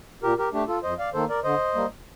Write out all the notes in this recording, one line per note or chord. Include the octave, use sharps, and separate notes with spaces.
A#2 G4 A#4
G4 A#4
A3 D4 G4
F4 A4
F2 C5 D#5
D5 F5
D#3 A#3 A4 C5
A#4 D5
D3 C5 D#5
G3 A#3